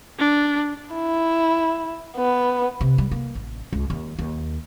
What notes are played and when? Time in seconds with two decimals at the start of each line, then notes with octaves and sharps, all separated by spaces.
0.19 D4
0.94 E4
2.17 B3
2.81 C3
2.98 G3
3.11 A#3
3.35 A1
3.73 C#2
3.90 D#2
4.19 D#2